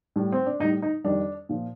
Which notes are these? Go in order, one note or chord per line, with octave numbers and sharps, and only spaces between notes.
A2 G3
C4
D4
A2 G3 D#4
D#4
F2 D#3 G3 D4
A#2 F3